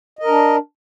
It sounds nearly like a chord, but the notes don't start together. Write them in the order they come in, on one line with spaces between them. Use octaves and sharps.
D#5 A#4 D4